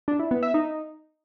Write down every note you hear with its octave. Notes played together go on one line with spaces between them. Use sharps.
D4
E4
B3
E5
D#4